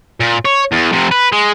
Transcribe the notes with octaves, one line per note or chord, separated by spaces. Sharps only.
A#2
C#5
E2
F2 C3
B4
G#3